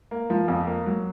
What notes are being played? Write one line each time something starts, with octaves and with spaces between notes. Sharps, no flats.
A#3
F3
F2
A#3
F#3